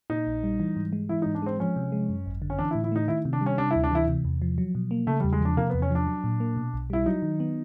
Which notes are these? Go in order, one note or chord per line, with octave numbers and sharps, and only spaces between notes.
A#2 D#4
A#1
G3
E3
G#2
G#3
E3 E4
G#2 D#4
D4
G#3 C4
F3 C#4
C3
G#3
F#2
G#1
D3
C#4
E3 D4
E4
A2
E4
A3 D#4
D#3 E4
C3
D4
G3
C#4
C3 D4
E4
D2
D4
E3 E4
C3
E2
F3
F#3
B2
A#3
C#3 A3
G3
E2
G#3
F3 D4
C3 A#3
B3
E2
C#4
F3 D4
F#3
A#2
A#3
B2
B1
G3 E4
F#3 D#4
D#3
B3